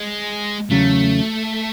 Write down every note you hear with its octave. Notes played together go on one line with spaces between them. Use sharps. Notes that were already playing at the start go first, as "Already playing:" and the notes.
Already playing: G#3
E2 C#3 F#3 A3 C#4